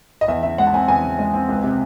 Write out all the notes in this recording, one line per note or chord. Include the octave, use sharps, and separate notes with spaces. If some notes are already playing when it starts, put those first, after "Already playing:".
D#5
E2 E5
C#3 E5
G#3 F#5
A5
C4 G#5
E2 G#5
C#3
G#3
C4
C#2
C3